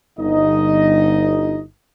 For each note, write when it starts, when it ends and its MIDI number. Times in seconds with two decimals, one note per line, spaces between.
0.19 1.61 31
0.19 1.61 63
0.19 1.61 75